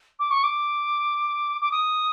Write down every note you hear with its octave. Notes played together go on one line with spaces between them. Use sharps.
D6
C#6
D6
D6
D#6